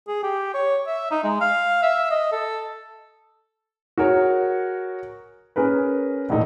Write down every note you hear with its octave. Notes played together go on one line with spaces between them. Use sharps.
G#4
G4
C#5
E5
D#4
G#3
F5
E5
D#5
A4
F#4 G#4 A#4 C#5
C#4 G#4 A#4 B4
E1 A#1 A2 D#4